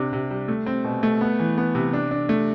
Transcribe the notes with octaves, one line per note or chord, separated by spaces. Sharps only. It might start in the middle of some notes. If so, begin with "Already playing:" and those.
Already playing: C3 D4
C3
G3
A3
C4
B2
A3
B3
E3
B3
C3
D4
D4
A3